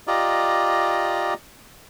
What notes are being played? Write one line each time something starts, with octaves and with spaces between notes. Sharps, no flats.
F4 G4 D5 D#5 A#5